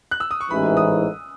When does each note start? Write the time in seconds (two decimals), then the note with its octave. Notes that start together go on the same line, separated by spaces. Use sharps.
0.11 F#6
0.20 E6
0.31 D#6
0.41 C#6
0.50 A1 G#2 E3 B5
0.77 D#6